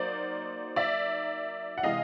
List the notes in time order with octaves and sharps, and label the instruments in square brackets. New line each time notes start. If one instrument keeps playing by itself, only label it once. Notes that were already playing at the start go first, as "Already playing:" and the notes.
Already playing: [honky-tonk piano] F#3 A#3 D#4 C5 D5
D5 E5
F#5
C3 E3 G#3 D#5 F5